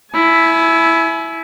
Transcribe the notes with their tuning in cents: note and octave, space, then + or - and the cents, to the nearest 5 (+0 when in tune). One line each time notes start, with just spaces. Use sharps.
E4 +0 G#5 +35